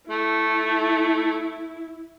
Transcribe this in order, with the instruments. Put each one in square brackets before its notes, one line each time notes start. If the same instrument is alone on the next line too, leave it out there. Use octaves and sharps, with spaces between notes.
[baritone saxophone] A3 [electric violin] E4